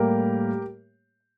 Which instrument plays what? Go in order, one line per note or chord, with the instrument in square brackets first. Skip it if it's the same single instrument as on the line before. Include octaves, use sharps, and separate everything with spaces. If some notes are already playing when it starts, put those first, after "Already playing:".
Already playing: [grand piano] A2 G3 A#3 G4 A#4